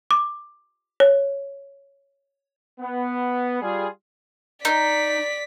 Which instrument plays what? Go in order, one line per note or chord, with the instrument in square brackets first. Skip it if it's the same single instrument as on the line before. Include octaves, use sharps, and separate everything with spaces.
[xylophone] D6
C#5
[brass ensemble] B3
G3 F4 G#4
[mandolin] D#4 [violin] D5 B6